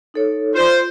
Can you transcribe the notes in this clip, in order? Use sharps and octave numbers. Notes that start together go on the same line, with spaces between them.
D#4 A4 C#5
F4 C5 D5